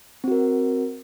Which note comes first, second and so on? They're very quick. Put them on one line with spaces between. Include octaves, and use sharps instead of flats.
C4 F#4 A#4